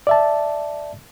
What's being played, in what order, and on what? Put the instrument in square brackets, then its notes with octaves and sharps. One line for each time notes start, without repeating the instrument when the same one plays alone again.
[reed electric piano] D5 E5 A5